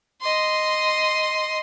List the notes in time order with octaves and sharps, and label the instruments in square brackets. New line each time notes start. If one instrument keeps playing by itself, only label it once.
[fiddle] D#5 C6